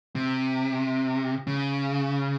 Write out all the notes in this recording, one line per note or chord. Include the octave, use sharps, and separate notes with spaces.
C3
C#3